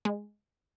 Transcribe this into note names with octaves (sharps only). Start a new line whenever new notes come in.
G#3